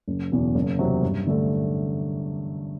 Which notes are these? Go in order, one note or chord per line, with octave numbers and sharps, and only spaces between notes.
F#1
E2 B2
F#1
E2 C3 F#3 C4
G2
D3 A3 D4 A4